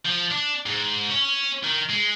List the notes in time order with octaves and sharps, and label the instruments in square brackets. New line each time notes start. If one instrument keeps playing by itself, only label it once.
[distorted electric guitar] F3
D4
G#2
C#4
D#3
G#3